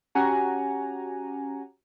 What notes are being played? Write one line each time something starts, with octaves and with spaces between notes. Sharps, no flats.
C#4 F#4 G4 F#5 G#5 A#5